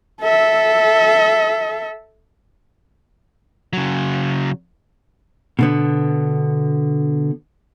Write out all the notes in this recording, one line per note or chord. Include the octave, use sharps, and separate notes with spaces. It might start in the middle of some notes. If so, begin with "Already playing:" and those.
A4 E5
C#3 F#3
B2 D3 B3